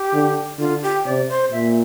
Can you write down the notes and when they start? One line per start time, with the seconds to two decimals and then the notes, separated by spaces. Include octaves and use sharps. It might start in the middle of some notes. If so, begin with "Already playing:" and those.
Already playing: G4
0.13 D3
0.59 D3 F4
0.83 G4
1.05 C3 D5
1.29 C5
1.52 A#2 E5